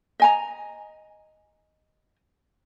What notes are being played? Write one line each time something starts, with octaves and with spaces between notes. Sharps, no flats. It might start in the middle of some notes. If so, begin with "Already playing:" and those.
D#5 G#5 A#5